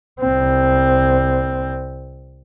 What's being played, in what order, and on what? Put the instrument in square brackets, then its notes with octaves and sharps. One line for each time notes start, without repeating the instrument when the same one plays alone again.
[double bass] C2 C4